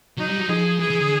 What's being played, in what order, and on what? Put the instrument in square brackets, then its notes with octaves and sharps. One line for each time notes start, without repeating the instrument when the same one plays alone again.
[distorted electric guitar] F#3 [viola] D#4
[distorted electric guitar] G3
F#3
[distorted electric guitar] F3 [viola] G#4
[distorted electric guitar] E3 [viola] G#4
[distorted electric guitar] E3
D3